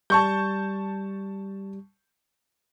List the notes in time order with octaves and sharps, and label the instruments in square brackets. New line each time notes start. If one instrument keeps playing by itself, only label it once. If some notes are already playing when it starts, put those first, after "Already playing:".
[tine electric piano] G3 [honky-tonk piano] A5 C#6 G6